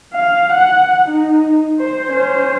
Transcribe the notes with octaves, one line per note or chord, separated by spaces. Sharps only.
F5
F#5
D#4
C5
C#4 C5